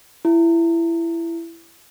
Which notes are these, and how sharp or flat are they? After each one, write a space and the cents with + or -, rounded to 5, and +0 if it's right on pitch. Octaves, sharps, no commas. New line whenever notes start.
E4 +20